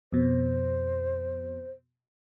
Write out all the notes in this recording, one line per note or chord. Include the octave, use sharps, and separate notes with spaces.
F2 B2 C5